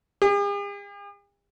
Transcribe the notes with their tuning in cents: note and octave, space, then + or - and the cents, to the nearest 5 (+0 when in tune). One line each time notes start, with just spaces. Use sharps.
G#4 -45